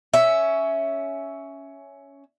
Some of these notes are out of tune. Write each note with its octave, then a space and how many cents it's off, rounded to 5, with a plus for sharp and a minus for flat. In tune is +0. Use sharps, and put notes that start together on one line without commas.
C#4 +10 E5 +0